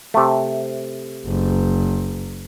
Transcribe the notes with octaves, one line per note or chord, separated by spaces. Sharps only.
C3 A3
F#1